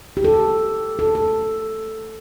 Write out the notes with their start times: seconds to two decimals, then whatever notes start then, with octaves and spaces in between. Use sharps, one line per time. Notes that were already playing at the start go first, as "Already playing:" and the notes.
0.17 G4
0.24 A4
0.99 A4
1.15 A4